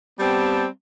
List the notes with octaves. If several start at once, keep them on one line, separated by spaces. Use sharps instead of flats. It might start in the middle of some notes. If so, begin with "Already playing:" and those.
G3 B3 C4 G4 A5